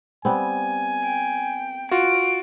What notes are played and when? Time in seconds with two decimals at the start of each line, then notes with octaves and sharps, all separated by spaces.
0.25 G3 B3 C4 G#5
1.04 G5
1.91 F4 F#4 D7